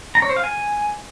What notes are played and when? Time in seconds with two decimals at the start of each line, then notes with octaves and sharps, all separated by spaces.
0.15 A#5
0.22 C#5
0.29 C5
0.37 F5
0.44 G#5